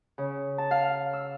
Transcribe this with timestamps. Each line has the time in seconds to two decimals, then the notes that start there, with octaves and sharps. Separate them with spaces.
0.18 C#3
0.58 A5
0.71 F5
1.13 E6